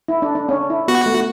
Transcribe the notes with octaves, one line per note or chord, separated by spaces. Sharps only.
E4
D4
D4
C#4
D4
E4
B3 F#4
A3